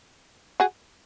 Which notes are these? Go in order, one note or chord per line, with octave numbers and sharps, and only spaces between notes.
F#4 G#4